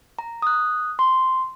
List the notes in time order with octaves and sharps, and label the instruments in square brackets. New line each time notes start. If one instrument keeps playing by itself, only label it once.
[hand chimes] A#5
D#6 F#6
C6